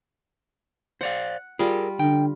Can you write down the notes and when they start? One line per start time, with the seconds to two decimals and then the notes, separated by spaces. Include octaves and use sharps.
1.01 C5 D5 F5 F#5
1.59 G3 F4 G#4 A#4
1.99 D3 G5